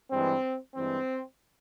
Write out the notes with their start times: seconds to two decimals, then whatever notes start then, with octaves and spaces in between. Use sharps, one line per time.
0.11 G2 E3 G#3 C4
0.75 G2 E3 G#3 C4